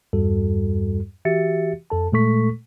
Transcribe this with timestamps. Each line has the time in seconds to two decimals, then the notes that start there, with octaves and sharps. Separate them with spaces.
0.13 E2 G2 G3 F#4 A4
1.25 E3 F#4 G4 E5 A6 C#7
1.90 F2 A4 A5
2.12 A#2 G#3 A3 A4 C#6 B6